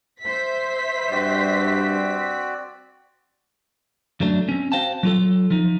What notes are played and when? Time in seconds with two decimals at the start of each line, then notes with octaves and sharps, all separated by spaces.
0.22 C5 E5 B6
1.12 G2 C4 F#4 D5
4.20 F#2 F#3 A3 D4
4.48 C4 C#4
4.72 F#4 C5 F5 G5 A5
5.03 F#3 F4 A4
5.51 F3 D#4